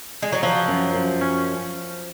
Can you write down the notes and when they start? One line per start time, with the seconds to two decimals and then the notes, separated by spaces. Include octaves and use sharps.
0.22 G#3
0.32 F#3
0.43 F3 F#3
0.68 F#2
0.95 F#2
1.21 C#4